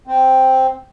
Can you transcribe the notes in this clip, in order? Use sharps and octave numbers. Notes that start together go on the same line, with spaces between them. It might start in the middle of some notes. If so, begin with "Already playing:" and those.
C4